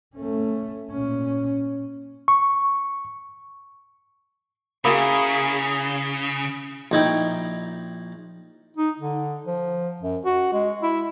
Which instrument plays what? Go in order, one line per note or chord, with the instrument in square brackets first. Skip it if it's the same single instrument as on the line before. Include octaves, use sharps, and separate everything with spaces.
[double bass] A3 C#4
A#2 C#4
[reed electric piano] C#6
[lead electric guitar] C#3 [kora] A#3 E4 F#4 [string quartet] G#4 [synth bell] B5 D#6
[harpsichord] A#1 D#4 E4 G5
[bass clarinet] D#4
D3
F3
F#2
F#4
G#3
E4